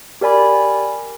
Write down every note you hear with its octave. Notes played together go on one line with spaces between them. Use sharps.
G4 A#4 D5 G#5 B5